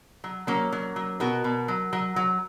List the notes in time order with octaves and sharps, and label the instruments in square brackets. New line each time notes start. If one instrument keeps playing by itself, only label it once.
[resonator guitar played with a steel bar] F#3
F#3 A#3 C#4
F#3
F#3
B2 F#4 A#4
B2
F#3
F#3
F#3